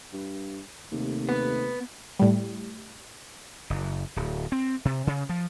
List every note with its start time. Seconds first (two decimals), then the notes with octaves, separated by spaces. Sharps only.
0.13 G2
0.92 D#2 C3 A3
1.29 B3
2.19 A2 G3
3.70 F#1
4.16 D1
4.52 C4
4.85 C3
5.07 C#3
5.29 F3